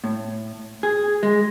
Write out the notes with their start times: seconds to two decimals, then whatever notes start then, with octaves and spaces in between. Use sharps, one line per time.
0.04 A2
0.83 G#4
1.23 G#3